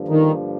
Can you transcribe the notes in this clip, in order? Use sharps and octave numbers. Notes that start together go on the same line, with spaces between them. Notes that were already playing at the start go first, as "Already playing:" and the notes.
Already playing: G2 D3 F3 A#3
D#3